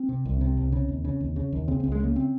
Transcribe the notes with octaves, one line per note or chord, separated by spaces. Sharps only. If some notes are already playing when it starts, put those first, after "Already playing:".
Already playing: C4
C3
C2
C3
C2
C#3
D#2
C#3
D#2
C#3
D#2
C#3 C4
C#2 C4
G#3
C#3 A#3
C4